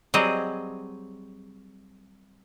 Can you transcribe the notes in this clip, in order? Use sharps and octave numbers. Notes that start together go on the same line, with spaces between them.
F#3 G3 C4 G#4 D#5